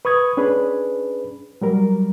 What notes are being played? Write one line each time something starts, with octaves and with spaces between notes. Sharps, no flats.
B4 C#6 D#6 G#6
C#4 D4 G#4 B4
F#3 G3 A#4